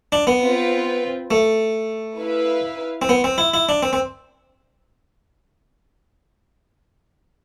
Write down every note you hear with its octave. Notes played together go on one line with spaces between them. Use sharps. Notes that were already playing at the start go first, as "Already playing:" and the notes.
D4
B3
C4 F4 B4
A3
E4 B4 F5
C4
B3
C4
E4
E4
D4
C4
C4